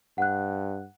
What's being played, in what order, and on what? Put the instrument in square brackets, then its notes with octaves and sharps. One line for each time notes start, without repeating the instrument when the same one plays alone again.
[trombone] G2 [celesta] F#5 F#6